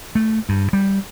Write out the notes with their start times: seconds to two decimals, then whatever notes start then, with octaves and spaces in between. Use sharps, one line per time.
0.15 A3
0.49 G2
0.73 G3